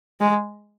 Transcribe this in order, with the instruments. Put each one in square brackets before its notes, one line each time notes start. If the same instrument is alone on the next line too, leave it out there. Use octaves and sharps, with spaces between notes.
[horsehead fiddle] G#3